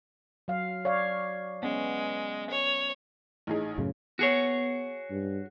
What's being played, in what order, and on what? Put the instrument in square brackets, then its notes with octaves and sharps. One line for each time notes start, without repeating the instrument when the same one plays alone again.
[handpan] F#3 F5
C#5 D5 F5
[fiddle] G#3 [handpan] B3 C#4
[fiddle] C#5
[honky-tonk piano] A1 D#4 G#4
[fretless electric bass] F#2 A2 C#3
[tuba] B3 [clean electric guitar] F#4 G#4 C#5
[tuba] G2